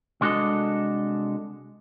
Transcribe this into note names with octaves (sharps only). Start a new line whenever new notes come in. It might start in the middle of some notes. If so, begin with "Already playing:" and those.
C2 G#3 D4 F#4 A4 D#5